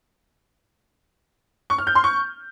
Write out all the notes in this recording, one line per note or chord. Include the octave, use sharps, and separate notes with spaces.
C#6
F6
G6
C6
C#6